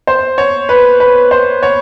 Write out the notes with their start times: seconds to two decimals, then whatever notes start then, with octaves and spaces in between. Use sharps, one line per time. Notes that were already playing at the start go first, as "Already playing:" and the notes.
0.07 C5
0.38 C#5
0.69 B4
1.00 B4
1.31 C5
1.63 C#5